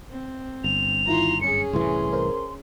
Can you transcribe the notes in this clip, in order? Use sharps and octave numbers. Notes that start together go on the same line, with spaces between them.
C4
G1 F7
D#3 E4 F4 A#5 C6
F#2 C#4 G#4 C#7
C2 A2 E3 C6
A#4 C5